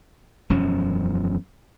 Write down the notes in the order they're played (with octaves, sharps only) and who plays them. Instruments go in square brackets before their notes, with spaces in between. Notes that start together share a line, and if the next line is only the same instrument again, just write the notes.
[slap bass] E1 F#2 F3 C#4